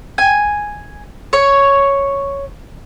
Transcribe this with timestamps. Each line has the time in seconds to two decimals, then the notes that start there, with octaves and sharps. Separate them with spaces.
0.18 G#5
1.33 C#5